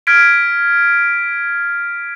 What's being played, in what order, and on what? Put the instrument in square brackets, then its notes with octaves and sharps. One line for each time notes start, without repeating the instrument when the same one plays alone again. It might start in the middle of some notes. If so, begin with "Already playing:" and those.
[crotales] F6 G#6 B6 D7